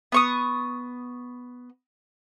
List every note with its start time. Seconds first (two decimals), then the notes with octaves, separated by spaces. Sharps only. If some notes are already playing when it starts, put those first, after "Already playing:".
0.12 B3 C#6 D#6